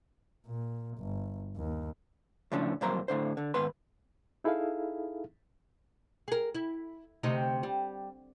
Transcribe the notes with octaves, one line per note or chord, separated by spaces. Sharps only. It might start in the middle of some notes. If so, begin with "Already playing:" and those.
A#2
G1
D#2
A2 C#3 F3 C#4 D4
C2 F2 F#3 A#3 C5 A#5
A2 D3 C5
D3
D#2 G#2 B3 B4 C6
D#4 E4 G#4 A4 E5 F5
G#4 A#4
E4
D2 C3 D#4
G3